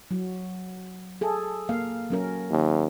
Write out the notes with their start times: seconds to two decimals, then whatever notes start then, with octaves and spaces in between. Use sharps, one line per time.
0.11 F#3
1.21 G#4 A4
1.69 A#3 F5
2.10 F#3 C#4 A#4
2.50 D#2